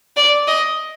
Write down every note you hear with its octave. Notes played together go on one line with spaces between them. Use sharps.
D5
D#5